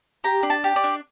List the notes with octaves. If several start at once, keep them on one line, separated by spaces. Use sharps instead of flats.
G4 A#5
D4
A5
G4
D5
D4